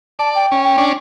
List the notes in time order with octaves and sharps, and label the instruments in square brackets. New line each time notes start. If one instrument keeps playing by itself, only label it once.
[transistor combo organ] D5 [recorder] A5
[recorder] G5
[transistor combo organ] C#4
[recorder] G5
[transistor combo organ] C#4 D4